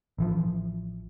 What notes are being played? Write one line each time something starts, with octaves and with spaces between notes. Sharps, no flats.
A1 E3 F3